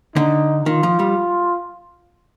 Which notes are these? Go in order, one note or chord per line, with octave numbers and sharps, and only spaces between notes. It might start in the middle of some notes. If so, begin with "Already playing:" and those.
D3 D#4
D#3 F4
F3
G3